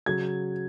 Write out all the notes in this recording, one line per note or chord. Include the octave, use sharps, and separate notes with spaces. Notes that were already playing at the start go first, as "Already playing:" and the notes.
C#3 F#3 G#6